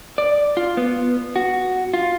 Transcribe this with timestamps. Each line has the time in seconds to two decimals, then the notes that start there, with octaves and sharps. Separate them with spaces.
0.18 D5
0.57 F4
0.77 B3
1.36 F#4
1.94 F4